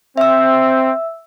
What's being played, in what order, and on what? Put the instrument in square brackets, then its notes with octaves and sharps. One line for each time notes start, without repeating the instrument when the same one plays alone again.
[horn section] C4 [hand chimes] E5 E6